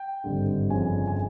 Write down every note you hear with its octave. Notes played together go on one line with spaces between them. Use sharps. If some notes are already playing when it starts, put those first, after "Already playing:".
Already playing: G5
G#1 G2 D3
G1 F2 C#3 F3 G#5
G#5